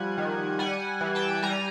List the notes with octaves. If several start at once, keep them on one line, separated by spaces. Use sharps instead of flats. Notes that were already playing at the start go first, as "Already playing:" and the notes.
Already playing: F3 G3 F#5 G#5
D#3
G3 F#5 G#5
E3
G5 A5
G3 G#5 A#5